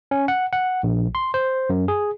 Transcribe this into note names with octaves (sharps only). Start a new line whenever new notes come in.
C#4
F#5
F#5
A#1
C6
C5
F#2
G#4